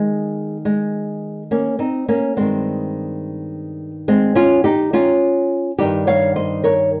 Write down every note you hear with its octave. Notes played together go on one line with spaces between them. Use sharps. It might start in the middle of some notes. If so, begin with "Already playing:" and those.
Already playing: D#3 G#3
G#3
A#3 C#4
C4 D#4
A#3 C#4
G2 D#3 G#3 C4
G#3 C4
C#4 F4
D#4 G4
C#4 F4
G2 D#3 D#4 G4
C#5 F5
C5 D#5
A#4 C#5